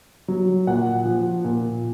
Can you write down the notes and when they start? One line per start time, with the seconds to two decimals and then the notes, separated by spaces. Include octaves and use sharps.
0.28 F#3
0.67 A#2 F#5
1.05 F3
1.44 A#2